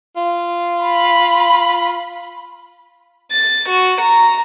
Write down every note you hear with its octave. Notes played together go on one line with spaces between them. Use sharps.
F4
B5
A6
F#4
A#5